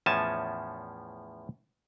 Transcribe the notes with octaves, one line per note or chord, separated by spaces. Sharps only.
E2 A2 F3 C#4 G#5 A5